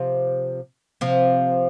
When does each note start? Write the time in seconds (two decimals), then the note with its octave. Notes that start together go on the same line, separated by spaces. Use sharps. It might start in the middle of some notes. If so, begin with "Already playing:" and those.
Already playing: C3 F3
1.01 C3 F3